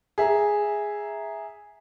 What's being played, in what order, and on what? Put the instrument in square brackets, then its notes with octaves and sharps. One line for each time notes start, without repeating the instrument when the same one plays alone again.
[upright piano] G#4 E5 A#5